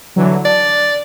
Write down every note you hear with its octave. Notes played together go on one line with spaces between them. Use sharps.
D3 E3 F#3
D4 D5